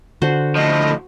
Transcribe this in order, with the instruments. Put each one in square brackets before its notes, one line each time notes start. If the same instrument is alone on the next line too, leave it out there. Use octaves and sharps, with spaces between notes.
[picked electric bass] D3 [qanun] F#4 C5
[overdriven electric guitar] A2 F3 [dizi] D#5